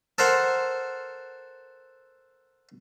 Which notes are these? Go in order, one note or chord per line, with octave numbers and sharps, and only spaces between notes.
A4 A#4 C5 F#5